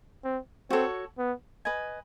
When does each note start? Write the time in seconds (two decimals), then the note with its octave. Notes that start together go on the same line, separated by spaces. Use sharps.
0.24 C4
0.70 C4 F#4 A4 C#5
1.18 B3
1.65 B4 D#5 G#5